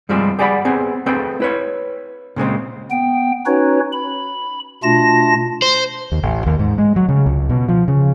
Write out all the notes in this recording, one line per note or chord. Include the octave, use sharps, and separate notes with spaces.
G2 F3 G3 G#3 C4
G4 G#4 D5 F#5 A#5 B5
B3 C4 G#4
A3 C4 G#4 B4 G5
E4 B4 C#5
A#2 C#3 G#3 C4
B3 G5
C#4 D#4 F#4 B4 C#5
B5
B2 A3 D4 F4 A5 A#6
C5
D#2
A1
D#2
G#2
G#3
F#3
C#3
C#2
B2
F3
C#3